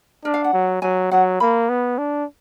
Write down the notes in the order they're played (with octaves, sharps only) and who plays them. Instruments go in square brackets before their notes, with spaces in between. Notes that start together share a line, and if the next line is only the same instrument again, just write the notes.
[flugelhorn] D4 [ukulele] A#4
[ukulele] F5
F#5
[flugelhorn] F#3
[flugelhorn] F#3 [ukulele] G#5
[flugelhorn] F#3 [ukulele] F#5
[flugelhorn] A#3 [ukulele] B5
[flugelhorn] B3
D4